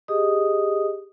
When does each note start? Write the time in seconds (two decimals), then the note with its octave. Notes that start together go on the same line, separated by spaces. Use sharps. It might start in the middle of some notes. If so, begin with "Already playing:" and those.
0.08 G4 G#4 D#5 D#6